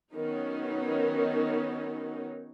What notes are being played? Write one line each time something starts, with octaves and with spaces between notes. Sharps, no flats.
D#3 F#3 B3 C#4 D#4